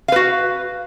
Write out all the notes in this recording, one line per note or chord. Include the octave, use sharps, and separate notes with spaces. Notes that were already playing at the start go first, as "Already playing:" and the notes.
F#4 B4 F5